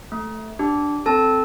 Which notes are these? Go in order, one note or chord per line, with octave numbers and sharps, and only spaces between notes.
A3
D4 G4
C4 A4 A5